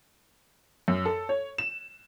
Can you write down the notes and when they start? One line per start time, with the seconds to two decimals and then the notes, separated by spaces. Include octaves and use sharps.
0.88 F#2
1.05 A4
1.29 C#5
1.58 E7